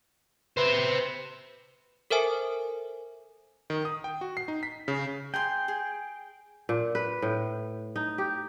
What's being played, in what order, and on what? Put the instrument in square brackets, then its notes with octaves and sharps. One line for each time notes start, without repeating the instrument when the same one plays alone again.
[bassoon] B4 [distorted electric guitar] C5 E5
[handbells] A4 A#4 C5 E5 G#5
[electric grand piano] D#3
D#6
G5
F#4
C7
D#4
B6
C#3
[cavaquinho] G#4 A#5 C6 [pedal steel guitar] G5
[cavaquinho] G#4
[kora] A#2
B4
A2
D#4
G4